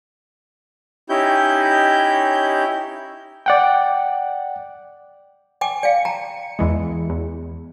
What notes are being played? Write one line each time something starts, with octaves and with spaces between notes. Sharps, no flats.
C#4 D#4 E4 G4 G6
D5 F#5 G5
G5 G#5 D6
D5 F5 C#7
G5 A5 A#5
E2 E3 G#3
E2